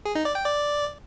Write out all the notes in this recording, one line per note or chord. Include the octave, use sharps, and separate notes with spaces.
G#4
D#4
D5
G5
D5